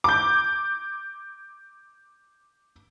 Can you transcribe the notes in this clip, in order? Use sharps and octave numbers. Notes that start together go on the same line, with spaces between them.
D6 G6